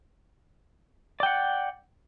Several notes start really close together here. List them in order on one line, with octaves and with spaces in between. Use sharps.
D5 G5 F#5